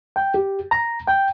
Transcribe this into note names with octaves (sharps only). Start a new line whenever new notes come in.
G5
G4
A#5
G5